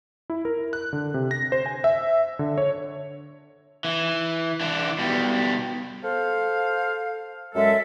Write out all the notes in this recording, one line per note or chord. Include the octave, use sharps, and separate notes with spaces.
E4
A#4
F#6
D3
C3
A#6
C5
G#5
E5
D3
C#5
E3
E3 D4
B2 G3
A4 C5 F5
F#2 G#3 A4 E5